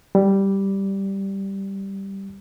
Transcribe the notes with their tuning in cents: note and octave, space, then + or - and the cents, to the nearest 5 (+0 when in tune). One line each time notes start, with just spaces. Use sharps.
G3 -5